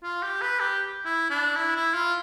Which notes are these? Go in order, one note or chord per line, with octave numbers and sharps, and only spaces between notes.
F4
G4
B4
G4
E4
D4
E4
E4
F4